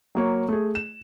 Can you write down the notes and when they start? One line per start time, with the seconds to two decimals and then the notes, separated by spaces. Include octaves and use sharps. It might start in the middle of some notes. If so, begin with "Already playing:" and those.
0.15 F#3 A#3 C#5
0.49 A3 G#4
0.75 E7